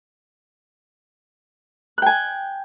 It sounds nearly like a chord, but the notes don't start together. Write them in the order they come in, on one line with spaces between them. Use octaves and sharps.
F#6 G5 G#5